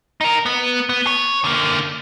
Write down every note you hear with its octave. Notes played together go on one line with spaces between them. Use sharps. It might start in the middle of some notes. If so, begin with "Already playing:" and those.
D#4 A#4
B3
B3
C#5
D3 A#3